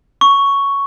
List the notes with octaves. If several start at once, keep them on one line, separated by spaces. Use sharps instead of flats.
C#6